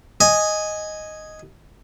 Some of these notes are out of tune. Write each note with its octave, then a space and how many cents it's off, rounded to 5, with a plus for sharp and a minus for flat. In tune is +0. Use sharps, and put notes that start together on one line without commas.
D#5 +0 G#5 +0